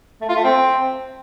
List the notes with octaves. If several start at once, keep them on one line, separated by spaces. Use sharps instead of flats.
A3
F4
A3
C4